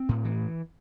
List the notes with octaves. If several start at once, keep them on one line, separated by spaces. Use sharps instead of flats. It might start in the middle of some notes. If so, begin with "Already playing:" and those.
Already playing: C4
A2
E3